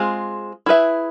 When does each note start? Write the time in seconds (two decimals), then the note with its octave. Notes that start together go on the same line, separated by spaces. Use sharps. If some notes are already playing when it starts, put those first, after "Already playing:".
Already playing: G#3 C4 F4 G#4
0.66 E4 G#4 B4 E5